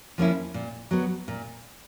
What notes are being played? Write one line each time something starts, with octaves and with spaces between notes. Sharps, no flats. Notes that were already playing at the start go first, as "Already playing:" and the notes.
F3 A#3 C#4 E4
A#2
F#3 B3
A#2